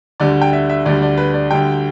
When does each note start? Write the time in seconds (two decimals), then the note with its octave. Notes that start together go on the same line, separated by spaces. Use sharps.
0.20 D2 D3 G3 D5
0.42 G5
0.53 E5
0.70 E5
0.85 D2 D3 G3 D5
1.02 D5
1.18 B4
1.34 D5
1.51 D2 D3 G3 G5